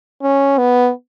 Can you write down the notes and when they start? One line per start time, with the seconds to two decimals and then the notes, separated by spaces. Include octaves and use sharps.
0.23 C#4
0.58 B3